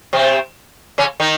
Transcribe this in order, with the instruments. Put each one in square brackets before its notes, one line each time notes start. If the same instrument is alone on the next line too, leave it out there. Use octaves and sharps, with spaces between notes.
[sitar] C3 C4
C#3 C#4
D#3 D#4